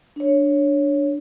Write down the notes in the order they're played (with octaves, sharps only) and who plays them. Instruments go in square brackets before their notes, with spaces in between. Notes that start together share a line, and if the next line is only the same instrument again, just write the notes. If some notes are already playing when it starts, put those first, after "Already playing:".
[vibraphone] D4 C#5